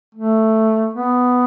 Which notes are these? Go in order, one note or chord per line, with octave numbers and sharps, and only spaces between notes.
A3
B3